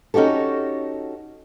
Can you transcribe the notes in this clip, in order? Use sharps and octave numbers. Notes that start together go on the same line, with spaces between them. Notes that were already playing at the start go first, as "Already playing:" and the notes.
C#4 D#4 F#4 G4 A4